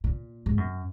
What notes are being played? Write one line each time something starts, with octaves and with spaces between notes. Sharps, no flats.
A#2
G#2
F#2